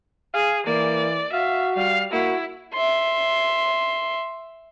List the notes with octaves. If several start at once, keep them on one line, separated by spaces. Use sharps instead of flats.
G#4 F5
E3 A#3 D5
F#4 E5 F5
G3 F5
A#3 E4 F#4
E5 C6